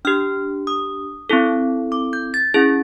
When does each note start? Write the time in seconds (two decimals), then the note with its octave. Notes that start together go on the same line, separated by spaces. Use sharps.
0.05 D4 G4 F6
0.67 D#6
1.30 C4 E4 A4
1.92 D6
2.13 G6
2.34 A6
2.54 C#4 E4 G#4 A6